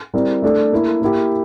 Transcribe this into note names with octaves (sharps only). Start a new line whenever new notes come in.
G3 C4 E4 A#4 D5
A3 D4 A4 D5
A#3 E4 A4
A#3 E4 G4